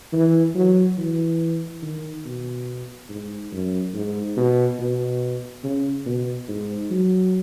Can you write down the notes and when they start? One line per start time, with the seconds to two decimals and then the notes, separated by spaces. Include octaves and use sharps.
0.13 E3
0.55 F#3
0.98 E3
1.82 D#3
2.25 B2
3.09 G#2
3.52 F#2
3.94 G#2
4.37 B2
4.79 B2
5.64 C#3
6.06 B2
6.48 G#2
6.91 F#3